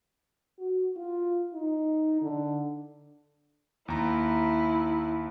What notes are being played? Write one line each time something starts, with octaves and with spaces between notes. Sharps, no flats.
F#4
F4
D#4
D3
D#2 E4 A#5